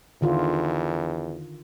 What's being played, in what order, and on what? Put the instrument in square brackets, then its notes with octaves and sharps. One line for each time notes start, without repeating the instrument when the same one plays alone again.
[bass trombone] E2 [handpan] D3 D#3 F4